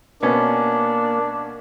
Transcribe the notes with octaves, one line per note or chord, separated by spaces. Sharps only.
B2 A#3 B3 C#4 D4